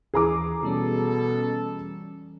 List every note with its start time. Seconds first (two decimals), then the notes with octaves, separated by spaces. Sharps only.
0.14 D#2 E3 G#4 A#5 D6
0.63 B2 E3 G3 C#4 A4